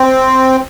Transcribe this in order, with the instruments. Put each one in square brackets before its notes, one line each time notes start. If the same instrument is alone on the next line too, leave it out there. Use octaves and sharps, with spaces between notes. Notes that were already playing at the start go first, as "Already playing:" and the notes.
Already playing: [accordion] C4